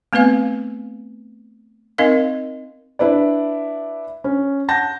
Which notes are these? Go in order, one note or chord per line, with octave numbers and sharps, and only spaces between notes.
A3 B3 C4 B4 F5
C4 D#4 A#4 D#5 F5
D4 E4 B4 D5
C#4
F#5 A5 G6 A#6